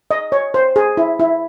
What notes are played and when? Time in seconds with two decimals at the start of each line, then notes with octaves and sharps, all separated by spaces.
0.11 D#5
0.32 C#5
0.54 C5
0.76 G#4
0.97 E4
1.20 E4